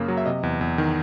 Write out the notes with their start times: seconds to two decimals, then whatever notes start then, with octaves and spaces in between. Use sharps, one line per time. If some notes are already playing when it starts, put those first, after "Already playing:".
Already playing: F#2 C#3 A#3
0.08 F#3
0.17 E5
0.26 C3 D#5
0.43 E2
0.61 E2
0.78 D#3